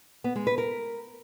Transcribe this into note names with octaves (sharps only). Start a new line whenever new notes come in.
B3
G#3
B4
A#4